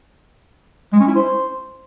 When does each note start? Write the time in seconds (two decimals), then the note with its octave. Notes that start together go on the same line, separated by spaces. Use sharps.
0.92 G#3
1.00 C#4
1.08 E4
1.15 C5